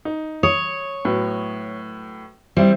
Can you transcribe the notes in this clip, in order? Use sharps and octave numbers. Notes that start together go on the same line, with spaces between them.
D#4
C#5 D#6
A2 F#3 B3
G3 C4 E4 C5